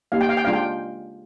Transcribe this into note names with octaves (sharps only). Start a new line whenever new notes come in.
A#3 D#4 G4 F5
G5
F5
G5
G#3 D4 F4 F5
G5